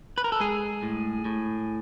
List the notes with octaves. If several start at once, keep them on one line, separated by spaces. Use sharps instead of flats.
B4
A#4
A4
G#3 G#4
A2
A2